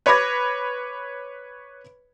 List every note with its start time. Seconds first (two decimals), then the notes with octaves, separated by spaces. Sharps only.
0.06 B4 C#5 B5 D6 G#6 A#6